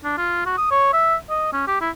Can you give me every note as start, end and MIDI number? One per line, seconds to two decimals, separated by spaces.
0.04 0.17 62
0.18 0.46 65
0.46 0.54 66
0.58 0.67 87
0.71 0.93 73
0.93 1.15 76
1.30 1.48 75
1.53 1.64 61
1.67 1.77 67
1.81 1.90 64